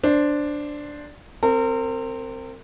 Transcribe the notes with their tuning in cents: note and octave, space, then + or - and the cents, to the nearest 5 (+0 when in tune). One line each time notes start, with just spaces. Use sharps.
D4 +0 C5 +0
C4 +0 A#4 -35